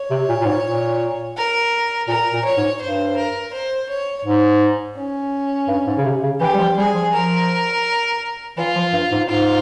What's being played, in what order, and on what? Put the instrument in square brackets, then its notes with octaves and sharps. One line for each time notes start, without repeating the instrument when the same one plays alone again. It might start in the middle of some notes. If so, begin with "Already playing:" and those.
Already playing: [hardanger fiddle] C#5
[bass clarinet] C3
A#2
A#2
G#2
A#2
[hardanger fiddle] A#4
[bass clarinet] A#2 [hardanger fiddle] A#4
[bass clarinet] A#2
[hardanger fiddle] C#5
[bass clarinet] G#2
[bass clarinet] G2 [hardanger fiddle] C5
[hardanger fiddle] A#4
C5
C#5
[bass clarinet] G#2
[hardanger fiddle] C#4
[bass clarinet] G2
G#2
C#3
C3
C#3
[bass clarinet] E3 [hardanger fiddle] G4
[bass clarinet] G3
F3
[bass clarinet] G3 [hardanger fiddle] G#4
[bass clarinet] F3
[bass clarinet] F3 [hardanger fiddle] A#4
[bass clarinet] E3 [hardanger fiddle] F4
[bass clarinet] F3
G2
G#2
[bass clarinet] G#2 [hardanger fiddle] F4